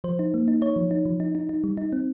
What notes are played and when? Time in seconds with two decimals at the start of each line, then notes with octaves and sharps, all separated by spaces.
0.04 F3 C5
0.19 D#4
0.34 A#3
0.48 D#4
0.62 D#4 C#5
0.76 F3
0.91 D#4
1.05 F3
1.20 D#4
1.35 D#4
1.49 D#4
1.64 G3
1.77 D#4
1.92 C4